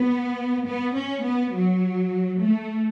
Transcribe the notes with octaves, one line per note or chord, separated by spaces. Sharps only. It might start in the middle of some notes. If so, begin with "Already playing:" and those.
Already playing: B3
B3
C#4
B3
F#3
A3